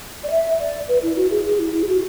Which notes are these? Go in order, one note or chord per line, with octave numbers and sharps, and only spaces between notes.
D5
E5
D5
B4
E4
F#4
G#4
G#4
E4
E4
G#4
F#4